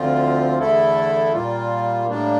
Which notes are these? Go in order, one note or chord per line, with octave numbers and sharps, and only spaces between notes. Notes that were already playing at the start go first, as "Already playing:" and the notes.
Already playing: D2 D3 F3 C4 F4
E2 D3 A3 E4 A4
A#2 G3 A#3 F4
A2 G3 A#3 D4